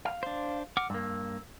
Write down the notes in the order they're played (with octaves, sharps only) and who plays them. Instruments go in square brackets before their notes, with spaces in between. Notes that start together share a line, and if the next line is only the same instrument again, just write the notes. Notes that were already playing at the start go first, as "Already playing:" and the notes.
[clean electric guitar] F5
[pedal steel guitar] D4 C5
F#5 D6 F6
[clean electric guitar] G2 A#3 [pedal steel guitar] E6